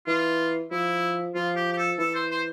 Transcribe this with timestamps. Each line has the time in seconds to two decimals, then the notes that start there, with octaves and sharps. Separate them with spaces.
0.07 E3 F4
0.71 F3 E4
1.35 F3 F4
1.56 G4
1.73 G4
1.78 A4
1.98 E3 A4
2.14 C5
2.31 C5